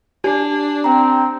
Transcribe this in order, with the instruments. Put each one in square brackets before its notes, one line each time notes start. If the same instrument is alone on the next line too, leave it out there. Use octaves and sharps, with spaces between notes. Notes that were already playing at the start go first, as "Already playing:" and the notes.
[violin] D4 [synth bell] G4
[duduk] C4 [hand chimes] G5 A#5